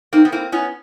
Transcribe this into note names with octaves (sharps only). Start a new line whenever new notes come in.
A#3 C4 D#4
B3
A#3 C4 E4
B3 C#4 E4